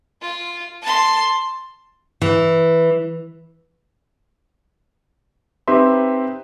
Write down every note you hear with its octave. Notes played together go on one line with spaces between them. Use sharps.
F4
A5 C6
E3
C4 D#4 G4 B4 E5 C6